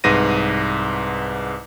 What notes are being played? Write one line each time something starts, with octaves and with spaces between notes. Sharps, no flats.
C2 G#2 B4 A#6 D#7